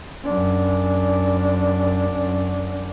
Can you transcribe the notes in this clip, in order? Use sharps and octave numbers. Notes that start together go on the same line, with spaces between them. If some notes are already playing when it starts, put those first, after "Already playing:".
F#2 D4